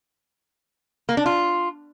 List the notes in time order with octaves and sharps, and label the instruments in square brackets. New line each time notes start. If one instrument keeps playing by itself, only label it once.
[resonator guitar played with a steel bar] A#3
D4
F4